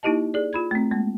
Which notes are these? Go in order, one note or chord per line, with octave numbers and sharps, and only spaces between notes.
A#3 D#4 E4 G4 D#5 A5
G#4 D5
F4 B5 G#6
A3 C4
G#3 A#3